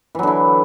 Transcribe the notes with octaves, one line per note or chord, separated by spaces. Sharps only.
D3 E3 F#3 E4